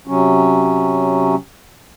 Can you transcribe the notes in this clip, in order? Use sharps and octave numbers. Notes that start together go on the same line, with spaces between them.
C3 F#3 C#4